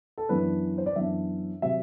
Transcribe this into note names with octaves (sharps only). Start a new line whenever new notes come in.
A4
F#2 E3 B3 D4 B4
C5
D5
F#2 E3 B3 D4 E5
C3 F#3 C4 E5